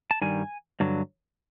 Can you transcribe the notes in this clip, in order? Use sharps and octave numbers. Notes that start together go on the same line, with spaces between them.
A5
G2 D#3 G3 G#5
G2 D3 F#3